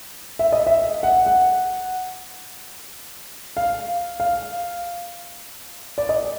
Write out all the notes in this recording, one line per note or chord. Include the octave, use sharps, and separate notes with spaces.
E5
D#5
E5
F#5
F#5
F5
F5
D5
D#5